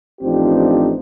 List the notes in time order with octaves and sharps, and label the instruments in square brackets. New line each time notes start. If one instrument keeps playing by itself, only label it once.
[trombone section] A1 F3 C4 D4 D#4 G4